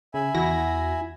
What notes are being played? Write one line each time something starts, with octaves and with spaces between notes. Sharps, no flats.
C#3 E5 G#5 B5
E2 E4 F#4 A#6